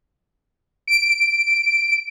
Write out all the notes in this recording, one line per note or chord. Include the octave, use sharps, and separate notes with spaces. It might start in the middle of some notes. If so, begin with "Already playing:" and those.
D7